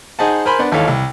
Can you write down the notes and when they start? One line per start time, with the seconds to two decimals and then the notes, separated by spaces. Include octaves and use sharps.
0.19 D#4 G#4 C5 D#5 F#5 A5
0.45 A#4 C5 G#5 B5 C6
0.59 B3 D4
0.72 G#1 D#2 E3 A4 C#5 F5
0.88 C2